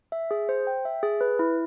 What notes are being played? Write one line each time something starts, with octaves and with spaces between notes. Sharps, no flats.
E5
G#4
C5
G5
E5
G#4
B4
E4